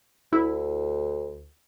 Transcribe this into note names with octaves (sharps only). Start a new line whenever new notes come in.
D2 E4